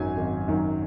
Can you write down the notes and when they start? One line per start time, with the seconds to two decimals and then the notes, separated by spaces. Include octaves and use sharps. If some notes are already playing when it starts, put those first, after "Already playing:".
Already playing: G#1 F#2 D#3 F#3 G#5
0.17 G#1
0.48 F#2 D#3 F#3